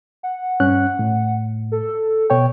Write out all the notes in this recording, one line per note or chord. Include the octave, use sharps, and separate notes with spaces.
F#5
G2 C#4 F#6
A2
A4
B2 C#5 G5